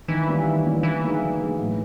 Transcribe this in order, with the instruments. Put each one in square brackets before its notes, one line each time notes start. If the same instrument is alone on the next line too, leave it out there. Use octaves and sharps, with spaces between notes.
[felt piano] D#3 [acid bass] E3
[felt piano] G3 A#3 C#4 E4
D#3
G3 A#3 C#4 E4
[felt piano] D3 [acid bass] E3
[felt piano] F#3 A#3 D#4 G#4
D3
F#3 A#3 D#4 G#4
A2